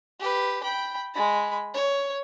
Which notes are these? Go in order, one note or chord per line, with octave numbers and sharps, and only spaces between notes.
G4 B4
G5 B5
G#3 B5
C#5